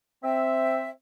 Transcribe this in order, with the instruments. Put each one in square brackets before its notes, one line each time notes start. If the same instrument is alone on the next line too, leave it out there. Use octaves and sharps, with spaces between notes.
[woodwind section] C4 E5